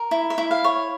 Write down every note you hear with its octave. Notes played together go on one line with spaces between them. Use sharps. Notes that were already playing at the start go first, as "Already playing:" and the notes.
Already playing: A#4
E4
E5
E4
F5
C#5